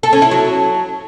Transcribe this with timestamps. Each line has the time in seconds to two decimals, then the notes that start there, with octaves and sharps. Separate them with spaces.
0.03 A4
0.13 C#4
0.22 E4
0.31 F#3